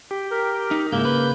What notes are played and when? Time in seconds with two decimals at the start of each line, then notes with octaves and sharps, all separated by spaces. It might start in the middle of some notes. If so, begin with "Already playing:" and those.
0.11 G4
0.31 A#4
0.71 D#4
0.92 G#2 C#3 A#3 E4 G6
1.05 B4